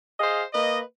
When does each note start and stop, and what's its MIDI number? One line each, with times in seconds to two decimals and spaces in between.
0.20 0.43 68
0.20 0.43 72
0.20 0.43 75
0.20 0.43 77
0.53 0.80 58
0.53 0.80 71
0.53 0.80 75